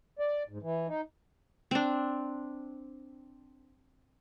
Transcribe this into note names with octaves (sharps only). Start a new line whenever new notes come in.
D5
G#2
E3
D#4
C4 D4